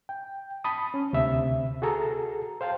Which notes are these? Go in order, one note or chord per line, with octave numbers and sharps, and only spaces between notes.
G5
A5 B5 D#6
C#4
D2 C3 E5
F#4 G#4 A4 A#5
C5 F5 G5 A5